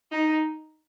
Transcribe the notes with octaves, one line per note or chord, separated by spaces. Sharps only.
D#4